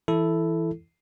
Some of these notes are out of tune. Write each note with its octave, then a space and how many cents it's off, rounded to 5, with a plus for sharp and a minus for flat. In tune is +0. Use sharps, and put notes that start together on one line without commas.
E3 +0 E4 +0 A4 +0